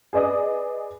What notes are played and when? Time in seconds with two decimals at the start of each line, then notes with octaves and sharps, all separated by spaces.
0.13 G#4 B4 D5 D#5 D#6